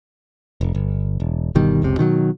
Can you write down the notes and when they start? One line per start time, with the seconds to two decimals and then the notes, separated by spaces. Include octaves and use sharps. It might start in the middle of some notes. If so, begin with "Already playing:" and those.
0.61 F1
0.75 G1
1.20 E1
1.55 G1 B2 D#3 G3
1.82 F#1 C#2 C3
1.98 B2 D#3 E3 F#3